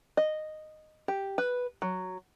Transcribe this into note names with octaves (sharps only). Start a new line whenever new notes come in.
D#5
G4
B4
F#3